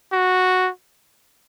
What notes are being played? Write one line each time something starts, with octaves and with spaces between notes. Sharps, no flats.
F#4